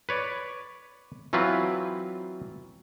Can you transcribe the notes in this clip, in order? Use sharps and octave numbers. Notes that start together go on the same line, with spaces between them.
B4 C#5 D5
E3 F#3 C4 F4 B4